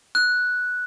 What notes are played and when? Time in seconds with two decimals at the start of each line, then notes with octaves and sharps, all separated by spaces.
0.15 F#6